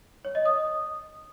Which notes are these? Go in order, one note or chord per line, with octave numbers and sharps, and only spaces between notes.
C#5
D#5
D#6